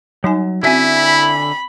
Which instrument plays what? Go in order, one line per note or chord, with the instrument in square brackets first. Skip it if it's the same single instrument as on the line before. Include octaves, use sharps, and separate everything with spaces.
[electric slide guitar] F#3 [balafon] G3 D#4 G#5
[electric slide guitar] D3 E5 G#5 [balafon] C4 C#4 F#4 [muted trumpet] E4
[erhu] B5